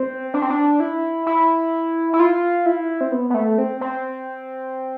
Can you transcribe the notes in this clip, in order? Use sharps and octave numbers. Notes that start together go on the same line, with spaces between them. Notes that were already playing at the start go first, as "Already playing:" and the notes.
Already playing: C4
D4
C4
D4
E4
E4
E4
F4
E4
C4
B3
B3
A3
C4
C4